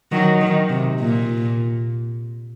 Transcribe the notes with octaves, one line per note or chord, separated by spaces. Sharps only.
D#3 F#3
D#3
C3
A#2